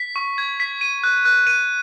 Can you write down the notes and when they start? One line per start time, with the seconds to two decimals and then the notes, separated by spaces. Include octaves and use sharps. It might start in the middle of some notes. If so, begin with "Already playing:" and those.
Already playing: B6
0.16 C#6
0.38 G#6
0.60 B6
0.81 D#7
1.03 F#6
1.25 F#6
1.47 D#7